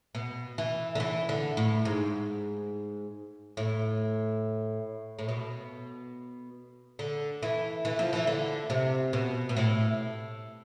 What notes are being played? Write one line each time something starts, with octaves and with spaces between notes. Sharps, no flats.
B2
E3
D3
E3
D3
A2
G#2
A2
A2
B2
D3
E3
E3
F3
E3
D3
C3
B2
B2
A2